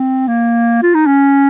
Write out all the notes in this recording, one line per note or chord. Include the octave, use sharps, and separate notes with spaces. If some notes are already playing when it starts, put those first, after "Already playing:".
Already playing: C4
A#3
F4
D#4
C#4